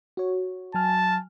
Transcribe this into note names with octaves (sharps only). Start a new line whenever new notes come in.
F#4 C#5
F#3 G#5 A5 F6